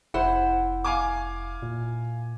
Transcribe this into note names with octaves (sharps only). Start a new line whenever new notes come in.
F1 E4 C5 F#5
F5 G#5 D6
A#2